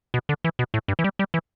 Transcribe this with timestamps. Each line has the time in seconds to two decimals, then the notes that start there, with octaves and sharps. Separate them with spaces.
0.14 B2
0.29 D3
0.44 E3
0.59 B2
0.74 A2
0.88 G2
0.99 E3
1.04 G3
1.19 G3
1.34 E3